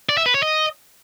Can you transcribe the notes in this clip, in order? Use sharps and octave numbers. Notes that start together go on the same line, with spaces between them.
D5
E5
B4
C#5
D#5